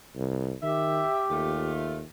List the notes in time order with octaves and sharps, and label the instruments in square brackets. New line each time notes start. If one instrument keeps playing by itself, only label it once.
[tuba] C2
[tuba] D#3 [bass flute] G4 [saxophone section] E5
[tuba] D#2 [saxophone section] A3 F4